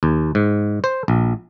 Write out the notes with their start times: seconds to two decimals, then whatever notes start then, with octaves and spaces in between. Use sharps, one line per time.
0.03 D#2
0.35 G#2
0.84 C5
1.08 A#1